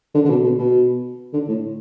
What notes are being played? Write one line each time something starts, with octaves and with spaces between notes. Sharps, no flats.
D3
D3
B2
B2
B2
D3
A2